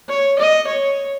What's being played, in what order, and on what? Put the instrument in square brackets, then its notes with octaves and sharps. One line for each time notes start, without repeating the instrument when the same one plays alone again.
[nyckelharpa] C#5
D#5
C#5